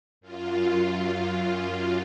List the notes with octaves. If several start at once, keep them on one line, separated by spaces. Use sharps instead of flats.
F#2 F4